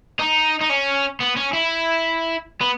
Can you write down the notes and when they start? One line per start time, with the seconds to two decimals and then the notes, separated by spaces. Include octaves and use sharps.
0.19 D#4
0.61 D#4
0.70 C#4
1.20 B3
1.36 C#4
1.53 E4
2.61 B3